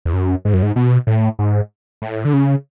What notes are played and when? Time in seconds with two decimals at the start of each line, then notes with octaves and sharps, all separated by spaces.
0.05 E2
0.13 F#2
0.45 G#2
0.54 F#2
0.63 G#2
0.76 B2
1.07 A2
1.39 G#2
2.02 A2
2.25 D3
2.33 C#3